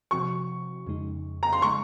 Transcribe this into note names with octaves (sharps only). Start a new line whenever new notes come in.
C3 F3 C4 F#4 C#6
F2 C#3 G#3 D#4
A#5
C6
C#3 G#3 C#6